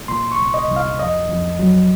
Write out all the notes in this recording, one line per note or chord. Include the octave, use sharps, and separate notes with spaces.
A#2 C6
C#6
C2
D#5
C2
F5
F2 D#5
F2
F#3